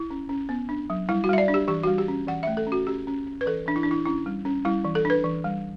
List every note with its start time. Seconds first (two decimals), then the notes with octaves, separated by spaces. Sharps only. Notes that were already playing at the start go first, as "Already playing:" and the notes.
Already playing: E4
0.10 C#4
0.29 C#4
0.49 B3
0.69 D4
0.90 F#3
1.09 G3 E4
1.24 F#4
1.29 G3 E5
1.38 D5
1.48 D4
1.54 G4
1.68 E3 G4
1.83 G3 F#4
1.98 G4
2.08 C#4
2.27 E3 F#5
2.43 A3 E5
2.57 A4
2.67 C#4 F#4
2.87 C#4 G4
3.07 C#4
3.27 C#4
3.41 B4
3.46 E3 A4
3.66 E3 D4
3.76 E4
3.83 E3 D4
3.91 E4
4.05 C#4 E4
4.26 G3
4.45 C#4
4.65 G3 E4
4.85 E3
4.95 A4
5.05 D4 B4
5.24 E3
5.44 G3